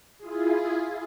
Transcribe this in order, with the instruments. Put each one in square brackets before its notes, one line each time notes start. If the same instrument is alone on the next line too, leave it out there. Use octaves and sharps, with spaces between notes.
[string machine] E4 F4 G#4